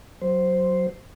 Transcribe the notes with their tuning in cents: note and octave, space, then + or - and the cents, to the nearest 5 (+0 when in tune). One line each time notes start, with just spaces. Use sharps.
F#3 +0 C5 +0